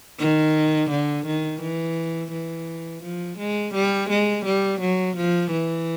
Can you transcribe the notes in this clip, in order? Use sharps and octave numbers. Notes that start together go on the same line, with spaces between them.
D#3
D3
D#3
E3
E3
F3
G#3
G3
G#3
G3
F#3
F3
E3